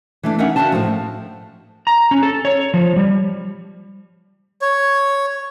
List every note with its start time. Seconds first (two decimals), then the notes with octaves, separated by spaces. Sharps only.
0.23 E3 A3 D4
0.38 C#4 D#4 A#4 E5 F#5
0.56 D4 F#4 E5 F5 G5 A5
0.72 A2 F3
1.87 A#5
2.11 C#4
2.23 A4
2.45 C#5
2.74 F3
2.96 G3
4.62 C#5